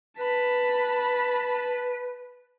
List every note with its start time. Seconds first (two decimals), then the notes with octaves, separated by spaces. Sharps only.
0.19 B4 A5 B5